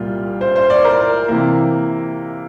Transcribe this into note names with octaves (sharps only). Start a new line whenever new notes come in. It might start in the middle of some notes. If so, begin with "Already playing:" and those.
Already playing: C2 A#2 G3 F4
C5
C5
D5
A#4
C3 E3 A#3